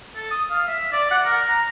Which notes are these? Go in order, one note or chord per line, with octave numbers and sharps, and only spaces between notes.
A4
D#6
F5
E5
D5
F#5
A#4
A#5